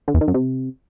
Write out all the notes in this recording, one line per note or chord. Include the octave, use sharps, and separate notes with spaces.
D3
E2
D#3
F#2
C3